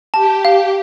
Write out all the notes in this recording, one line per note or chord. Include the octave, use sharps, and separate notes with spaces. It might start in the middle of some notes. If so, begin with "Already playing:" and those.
G4 A5
F5